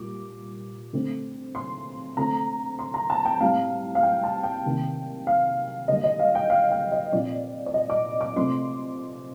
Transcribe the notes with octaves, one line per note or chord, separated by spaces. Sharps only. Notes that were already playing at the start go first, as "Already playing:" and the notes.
Already playing: A#2 G3 A#3 D6
D3 A3 C4
C6
D3 A3 C4 A#5
C6
A#5
A5
G5
A2 G3 C4 F5
F5
G5
A5
G5
C3 D#3 A#3
F5
D3 G3 A#3 D#5
D#5
F5
G5
F5
G5
D#5
A#2 F3 C4 D5
D5
D#5
D6
D6
C3 F3 A3 C4 C6